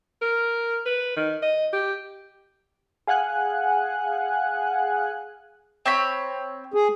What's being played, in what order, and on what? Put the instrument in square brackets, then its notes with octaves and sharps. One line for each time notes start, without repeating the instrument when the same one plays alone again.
[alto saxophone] A#4
B4
D#3
D#5
G4
[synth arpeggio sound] G#4 F5 F#5 G#5 F#6
[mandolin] C4 C#5 B5
[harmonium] G#4